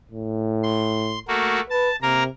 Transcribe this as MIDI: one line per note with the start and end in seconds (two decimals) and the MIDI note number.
0.11 1.19 45
0.64 1.19 84
1.28 1.60 57
1.28 1.60 58
1.28 1.60 66
1.70 1.90 71
1.70 1.96 81
2.02 2.28 48
2.02 2.23 58
2.02 2.23 70
2.02 2.23 82